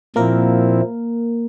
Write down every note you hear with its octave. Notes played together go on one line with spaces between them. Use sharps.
A#2 F3 A#3 C4 E4 A#4